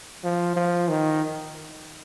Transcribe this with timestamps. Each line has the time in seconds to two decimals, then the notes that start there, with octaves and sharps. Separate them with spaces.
0.24 F3
0.56 F3
0.89 D#3